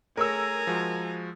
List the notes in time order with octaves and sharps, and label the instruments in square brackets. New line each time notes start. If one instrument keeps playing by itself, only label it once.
[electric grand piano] A3 G#4 C#5 [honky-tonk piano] A#4 E6 [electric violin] G#5 A#5
[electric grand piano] F3 G#3 F#4